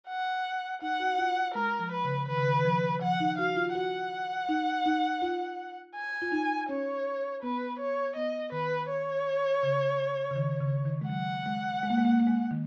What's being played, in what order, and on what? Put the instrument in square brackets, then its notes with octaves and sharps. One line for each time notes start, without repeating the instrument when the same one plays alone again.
[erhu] F#5
[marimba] D#4 [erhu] F#5
[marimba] F#4
F4
[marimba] G#3 [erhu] A#4
[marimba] F3
[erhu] B4
[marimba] C#3
[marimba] D#3 [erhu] B4
[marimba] C#3
D#3
D#3
F3
[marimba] F3 [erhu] F#5
[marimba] D#4
[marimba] F#4 [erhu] F5
[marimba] F4
[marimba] F#4 [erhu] F#5
[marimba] D#4
D#4
F4
[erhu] G#5
[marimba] F4
D#4
[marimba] C#4 [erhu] C#5
[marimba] B3 [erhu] B4
[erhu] C#5
[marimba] B3 [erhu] D#5
[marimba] D#3 [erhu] B4
[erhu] C#5
[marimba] C#3
C#3
D#3
C#3
D#3
G#3
[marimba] F#3 [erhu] F#5
[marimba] G#3
G#3
A#3
G#3
A#3
G#3
A#3
G#3
D#3